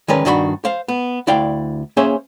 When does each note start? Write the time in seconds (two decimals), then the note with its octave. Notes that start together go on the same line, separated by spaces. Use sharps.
0.08 D#3 G#3 C#4 A#4 B4 D5
0.25 G2 D#3 D4 F#4 A#5 B5
0.65 C5 F5
0.88 B3
1.27 D2 E4 D5 F5 G5
1.97 A#3 C#4 G#4 C5 C#5 E5